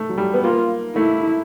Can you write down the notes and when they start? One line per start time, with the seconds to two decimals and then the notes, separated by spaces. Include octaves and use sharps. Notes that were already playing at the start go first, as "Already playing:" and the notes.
Already playing: A3
0.10 F#3
0.18 G3
0.34 B3
0.44 A#3 F4
0.96 A3 E4